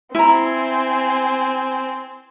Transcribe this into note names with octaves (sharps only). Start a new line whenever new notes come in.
C4 E4 G#5 A#5